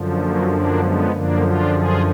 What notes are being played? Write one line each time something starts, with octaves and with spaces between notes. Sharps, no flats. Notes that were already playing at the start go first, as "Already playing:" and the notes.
Already playing: F#2 D3 F3
F#3 A#3
A#3 D4
G#3 B3
F#2 D3 F3 A#3 D4
D4 F4
F4 G#4